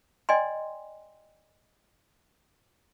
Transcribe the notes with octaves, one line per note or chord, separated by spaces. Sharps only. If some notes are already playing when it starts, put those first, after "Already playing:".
D5 D#5 G5 G#5 C6